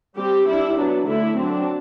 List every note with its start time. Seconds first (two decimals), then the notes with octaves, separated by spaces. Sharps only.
0.16 G3 C4 G4
0.47 G3 D4 E4
0.77 F#3 B3 D4
1.07 D3 A3 D4 E4
1.37 F#3 C4 D4